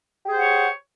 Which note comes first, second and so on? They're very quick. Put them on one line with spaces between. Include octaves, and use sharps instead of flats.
G4 G#4 C5 F#5 C#5